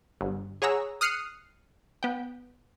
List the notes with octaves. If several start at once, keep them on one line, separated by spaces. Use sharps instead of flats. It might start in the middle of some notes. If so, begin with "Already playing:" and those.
G1
G#4 C#5 F#5 A#5 E6
D#6 F6 F#6 C7 C#7 D#7
B3 G5